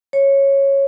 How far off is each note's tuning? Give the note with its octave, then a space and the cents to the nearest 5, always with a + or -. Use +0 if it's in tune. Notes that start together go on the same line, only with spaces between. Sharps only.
C#5 -10